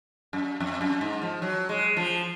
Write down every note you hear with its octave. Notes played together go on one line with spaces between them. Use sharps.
F#2
F2
F#2
G#2
F3
F#3
G#3
F3